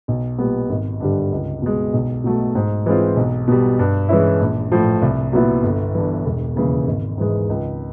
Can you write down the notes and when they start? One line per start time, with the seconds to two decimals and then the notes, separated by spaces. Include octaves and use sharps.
0.08 B1
0.38 A#2 G3 B3
0.69 G#1
1.00 G2 D3 G3
1.32 C#2
1.62 B2 G#3
1.93 B1
2.24 B2 F#3 A3
2.55 G#2
2.86 E3 G#3 C4 F4
3.16 B1
3.48 B2 G3
3.79 G2
4.09 E3 G#3 C#4 E4
4.40 A#1
4.72 A2 F3
5.02 C2
5.33 A#2 F#3 B3 E4
5.63 G1
5.95 G2 E3
6.26 E1
6.56 D#2 C#3 E3
6.87 G#1
7.18 G#2 E3 G#3
7.49 C#2